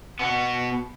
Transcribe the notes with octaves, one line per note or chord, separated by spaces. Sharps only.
B2 B3